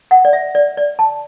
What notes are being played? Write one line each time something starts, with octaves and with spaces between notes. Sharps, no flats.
F#5
D5
E5
D5
D5
A5